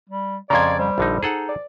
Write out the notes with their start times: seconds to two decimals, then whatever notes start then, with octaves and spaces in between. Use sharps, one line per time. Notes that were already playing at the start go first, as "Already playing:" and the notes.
0.09 G3
0.50 F2 C#3 D5 A#5 C6 G#6
0.79 G3 C5
0.98 A#1 D3 D#4
1.23 D#4 G#4 A4 F#5
1.49 D5